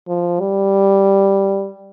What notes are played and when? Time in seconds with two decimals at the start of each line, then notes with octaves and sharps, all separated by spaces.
0.08 F3
0.40 G3